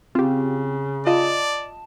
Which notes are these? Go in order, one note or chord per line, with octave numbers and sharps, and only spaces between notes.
C#3 C4 F4 G4
F4 D5 D#5 A5